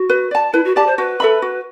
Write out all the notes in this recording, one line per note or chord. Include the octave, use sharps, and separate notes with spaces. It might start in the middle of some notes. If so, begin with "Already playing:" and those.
Already playing: F#4
B4
D5 A5
E4 B4
F#4
G4 D5 A5
C5
F#4 B4
A4 E5 B5
F#4